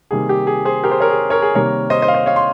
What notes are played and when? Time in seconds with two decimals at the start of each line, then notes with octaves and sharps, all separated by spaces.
0.11 C3 D#3 G3 A#3 G#4
0.29 G4
0.47 G#4
0.65 G#4 C5
0.84 G4 A#4
0.91 G#4 C5
1.00 A#4 C#5
1.10 G#4
1.30 A#4 C#5
1.42 G#4
1.55 C3 D#3 G3 A#3 A#4 C#5
1.90 C5 D#5
2.02 C5 D#5
2.08 F5
2.15 C5 D#5
2.26 C#5 F5
2.36 C6